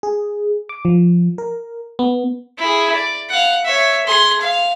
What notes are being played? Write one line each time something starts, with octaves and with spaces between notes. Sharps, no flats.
G#4
D6
F3
A#4
B3
E4 G#4
D5
F5 F#5
C#5 E5
G#4 C6
F5